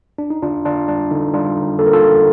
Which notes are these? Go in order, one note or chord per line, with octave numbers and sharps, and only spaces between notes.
D4
D#4
D3 D4 F4
D3 D4 F4
G3 D4
D3 D#4
G3 D4 F4
D3
A#3 A4
A#4
F4 A4
D3